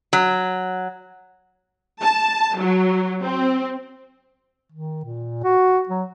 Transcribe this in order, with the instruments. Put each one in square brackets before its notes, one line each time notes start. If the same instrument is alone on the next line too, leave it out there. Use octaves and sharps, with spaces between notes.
[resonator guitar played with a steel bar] F#3
[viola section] A5
F#3
C4
[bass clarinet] D#3
A#2
F#4
F#3